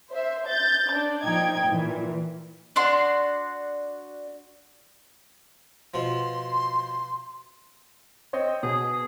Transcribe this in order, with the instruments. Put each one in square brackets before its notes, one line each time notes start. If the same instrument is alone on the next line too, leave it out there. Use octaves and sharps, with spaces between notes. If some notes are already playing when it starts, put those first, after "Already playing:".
[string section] C5 E5
G6 A6
D4
A#2 F3 D#4 G5 G#6
A#2 E3
[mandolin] D4 F#4 C6
[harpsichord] B2 F3 [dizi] C6
[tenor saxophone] C4 [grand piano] C#5 D#5
[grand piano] B2 [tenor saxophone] G#4